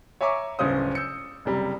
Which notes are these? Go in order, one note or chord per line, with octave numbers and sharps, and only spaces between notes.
C#5 E5 G#5 A#5 C#6 D6
D1 G1 C#3 C5 D#6
E6 G6 C#7
F#1 C3 G3 A#5